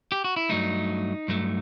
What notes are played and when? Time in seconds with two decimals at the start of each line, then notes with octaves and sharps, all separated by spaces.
0.12 G4
0.24 F#4
0.36 E4
0.49 G2 F#3 A3 D#4
1.28 G2 F#3 A3